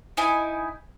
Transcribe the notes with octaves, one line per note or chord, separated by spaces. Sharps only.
D#4 E4 G#5